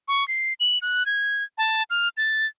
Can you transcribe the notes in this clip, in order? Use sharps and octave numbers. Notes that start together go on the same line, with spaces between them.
C#6
C7
F#7
F#6
G#6
A5
F6
A6